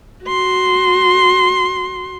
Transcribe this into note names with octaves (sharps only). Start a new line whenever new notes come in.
F#4 C6